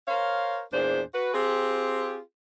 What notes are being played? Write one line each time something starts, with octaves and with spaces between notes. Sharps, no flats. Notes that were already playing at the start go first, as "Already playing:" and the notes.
A#4 C5 C#5 F5
E2 A#2 D4 G#4 C5
F#4 B4
C4 F4 G4 G#4